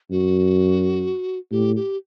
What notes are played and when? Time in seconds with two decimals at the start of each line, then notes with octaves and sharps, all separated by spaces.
0.11 F#2 F#4
1.52 A2 G4
1.76 G4